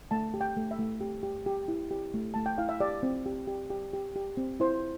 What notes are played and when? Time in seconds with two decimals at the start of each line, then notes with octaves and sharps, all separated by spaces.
0.11 A3 A5
0.34 G4
0.41 G5
0.57 A3
0.71 E5
0.79 A3
1.01 G4
1.23 G4
1.46 G4
1.68 E4
1.91 G4
2.14 A3
2.34 A3 A5
2.46 G5
2.58 E4 F5
2.69 E5
2.80 G4 D5
3.03 C4
3.26 G4
3.47 G4
3.70 G4
3.93 G4
4.16 G4
4.37 C4
4.60 E4 C5